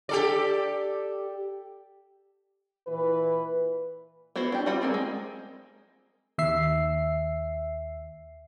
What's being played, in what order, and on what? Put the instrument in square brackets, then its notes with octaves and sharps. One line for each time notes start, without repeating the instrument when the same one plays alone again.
[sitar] G4 A4 D5
[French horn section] A#2 E3 B4
[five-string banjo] B3 E4 F#4 C5
D4 G4
G3 C4 F4 F#5 B5
A#3 C4 G#4
G#3
[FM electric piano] D#2 E5 C7